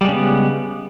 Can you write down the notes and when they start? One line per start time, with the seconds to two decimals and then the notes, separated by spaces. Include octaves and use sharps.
0.01 G3
0.05 G#3
0.08 C#3
0.12 B3